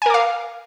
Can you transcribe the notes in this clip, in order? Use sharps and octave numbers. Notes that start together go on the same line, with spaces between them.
A#4 F5 G#5 D6